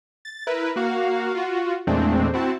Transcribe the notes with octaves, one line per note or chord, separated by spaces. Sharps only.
A6
E4 A#4 B4
A#3 F#4 F5
F4 F#4
E2 A#2 G#3 A3 C4 D4
C4 E4 F#4 A5